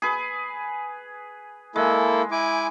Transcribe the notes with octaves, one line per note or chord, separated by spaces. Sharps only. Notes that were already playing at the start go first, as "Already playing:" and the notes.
G#4 B4
G#3 A#3 E4 A4
E4 G#5 D6